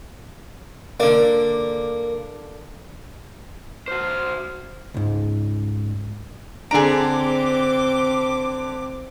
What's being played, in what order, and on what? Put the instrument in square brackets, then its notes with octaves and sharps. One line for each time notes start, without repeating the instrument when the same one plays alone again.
[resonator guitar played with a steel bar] D3 D5 [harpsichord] A#3
[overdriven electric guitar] F#4 C5 [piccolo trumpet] F6
[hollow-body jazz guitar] C#2 G#2
[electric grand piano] D3 D4 D7 [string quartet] C4 D6 [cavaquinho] G#4 A#5